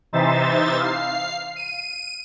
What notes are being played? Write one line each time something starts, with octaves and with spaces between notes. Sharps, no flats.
C3 E3 D#4 C5 E5 A6
F5 C7
D#7